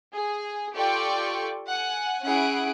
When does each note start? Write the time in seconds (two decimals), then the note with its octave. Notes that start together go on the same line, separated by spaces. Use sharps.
0.14 G#4
0.75 F4 G4 A4 D5 G5 C#6
1.69 F#5 G#5
2.23 C#4 E4 G#4 F#5 D7